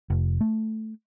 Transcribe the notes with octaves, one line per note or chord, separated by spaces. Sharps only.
F1
A3